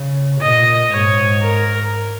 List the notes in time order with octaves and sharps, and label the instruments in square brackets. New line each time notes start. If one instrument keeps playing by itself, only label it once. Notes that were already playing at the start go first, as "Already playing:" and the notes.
Already playing: [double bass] C#3
[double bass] A#2 [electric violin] D#5
[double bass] G#2 [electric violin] C#5
[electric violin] A#4